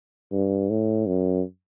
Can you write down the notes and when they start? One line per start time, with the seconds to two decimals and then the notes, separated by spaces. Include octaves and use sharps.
0.32 G2
0.70 A2
1.08 F#2